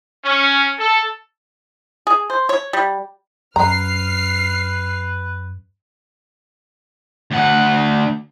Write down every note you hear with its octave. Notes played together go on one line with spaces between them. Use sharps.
C#4
A4
G#4
C5
C#5
G3
F#2 B4 A#5 F6 C7
D2 F#5